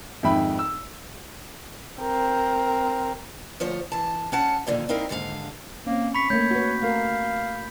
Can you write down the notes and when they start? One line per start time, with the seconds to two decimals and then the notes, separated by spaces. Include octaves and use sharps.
0.23 F2 G#2 D#3 E5 G5 B5
0.59 E6
2.01 C4 A#4
3.60 D2 F3 C5 C#5
3.92 E3 A5
4.32 C#4 F#5 A5
4.67 F2 A#2 D3 D#3
4.89 C4 D#4 E4 A#4 F5
5.09 D#2 G#2 D3 G4 F5
5.87 A#3 C4 C#4
6.15 B5 C#6 B6
6.30 A3 A#3 C#5 G6
6.51 F#4 B4
6.83 A3 A#4 F5